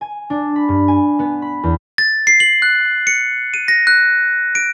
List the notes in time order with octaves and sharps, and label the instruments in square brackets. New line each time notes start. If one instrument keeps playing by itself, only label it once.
[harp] G#5
D4
B5
G2
G#5
B3
B5
E2
[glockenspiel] A6
C7
F#7
F#6
C#7
D#7
A#6
F#6
D7